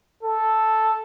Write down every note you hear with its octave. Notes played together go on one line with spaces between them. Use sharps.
A4